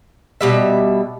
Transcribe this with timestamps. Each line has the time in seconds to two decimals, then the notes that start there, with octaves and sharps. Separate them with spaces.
0.41 B2 G3 E5